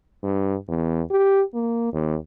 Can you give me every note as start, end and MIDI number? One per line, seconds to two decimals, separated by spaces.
0.23 0.55 43
0.68 1.01 40
1.11 1.41 67
1.55 1.91 58
1.93 2.15 39